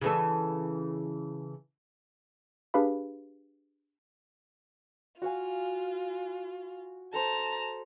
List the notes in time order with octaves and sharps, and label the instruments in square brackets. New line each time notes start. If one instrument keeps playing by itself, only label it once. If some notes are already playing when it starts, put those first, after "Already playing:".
[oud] C#3 E3 A4
[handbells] D4 G4 G#4 B4 F5 B5
[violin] F4 [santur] F#4 F5 G#5
[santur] A4 C5 [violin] A5 A#5